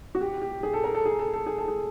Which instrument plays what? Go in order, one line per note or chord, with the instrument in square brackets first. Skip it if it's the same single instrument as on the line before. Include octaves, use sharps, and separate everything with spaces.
[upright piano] F#4
G4
G4
G#4
A4
A#4
A4
G#4
A4
A4
G#4
A4
G#4